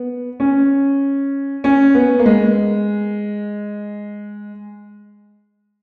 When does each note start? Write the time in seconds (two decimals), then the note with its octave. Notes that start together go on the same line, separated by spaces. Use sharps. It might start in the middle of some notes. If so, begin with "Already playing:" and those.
Already playing: B3
0.40 C#4
1.64 C#4
1.94 B3
2.19 A#3
2.26 G#3